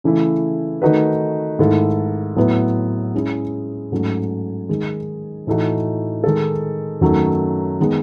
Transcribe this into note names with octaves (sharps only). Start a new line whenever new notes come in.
C#3 E3 A3 E4
D#3 A3 D#4 F#4 B4
G#2 D#3 A3 E4 A4
A2 F#3 B3 E4 B4
G#3 C#4 E4 G#4
G#2 F#3 A3 C#4
D#3 G#3 D#4
A2 E3 A3 D#4 F#4
D#3 G#3 D#4 A4
F#2 D#3 F#3 A3
D#3 G#3 B3